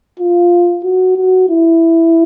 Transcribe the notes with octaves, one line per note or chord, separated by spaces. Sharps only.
F4
F#4
F#4
E4